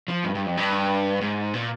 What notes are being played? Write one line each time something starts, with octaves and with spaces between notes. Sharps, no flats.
F3
G2
G2
F2
G2
G#2
A#2